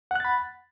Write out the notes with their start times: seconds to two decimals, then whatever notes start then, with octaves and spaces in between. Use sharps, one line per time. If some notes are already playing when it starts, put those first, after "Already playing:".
0.11 F#5
0.16 F#6
0.20 A6
0.25 B5